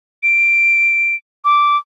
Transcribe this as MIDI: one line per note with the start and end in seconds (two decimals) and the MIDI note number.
0.23 1.15 98
1.45 1.77 86